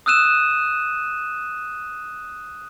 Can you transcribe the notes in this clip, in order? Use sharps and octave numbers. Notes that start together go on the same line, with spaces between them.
D#6 E6 F#6 D#7 E7